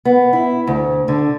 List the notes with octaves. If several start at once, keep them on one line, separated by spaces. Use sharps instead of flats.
B3
E4
D2
D3